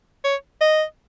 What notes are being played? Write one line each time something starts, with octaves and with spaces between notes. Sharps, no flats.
C#5
D#5